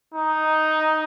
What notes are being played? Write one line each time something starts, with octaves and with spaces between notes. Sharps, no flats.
D#4